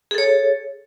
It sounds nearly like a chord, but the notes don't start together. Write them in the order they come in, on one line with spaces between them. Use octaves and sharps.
G#4 A4 C#5